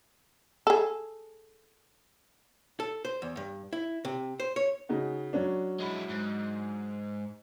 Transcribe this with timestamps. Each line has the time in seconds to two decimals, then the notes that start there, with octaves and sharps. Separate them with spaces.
0.67 G#4 A4
2.80 A4
3.05 C5
3.22 E2
3.37 G2
3.73 E4
4.05 C3
4.40 C5
4.56 C#5
4.89 C#3 D#4 F#4
5.33 F#3 C#4 D4
5.80 G#3 E4
6.09 G#2